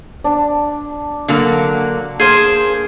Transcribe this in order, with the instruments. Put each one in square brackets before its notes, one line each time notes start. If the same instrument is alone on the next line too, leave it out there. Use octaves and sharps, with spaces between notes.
[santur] D4
[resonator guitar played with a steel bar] D3 F#3 A#3
[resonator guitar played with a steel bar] A#3 [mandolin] G#4 C5